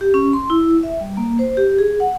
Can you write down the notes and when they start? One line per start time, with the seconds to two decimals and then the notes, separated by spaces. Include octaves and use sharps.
0.01 G4
0.14 C#4
0.33 C6
0.50 E4
0.83 E5
1.01 G3
1.17 A#3
1.39 C5
1.57 G4
1.78 G#4
2.00 F#5